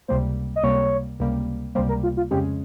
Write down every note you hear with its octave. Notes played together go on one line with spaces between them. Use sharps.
C#2 C3 G3 A#3 C5
D#5
C#2 C3 G3 A#3 C#5
C#2 C3 G3 A#3
C#2 C3 G3 A#3 C5
A#4
F4
F4
F2 C#3 G#3 C#4 G4